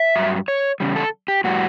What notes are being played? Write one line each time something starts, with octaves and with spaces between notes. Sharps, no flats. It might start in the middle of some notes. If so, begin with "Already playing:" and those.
Already playing: E5
G2 F#3
C#5
E2 C#3 G3
A4
G4
A2 G3 F#4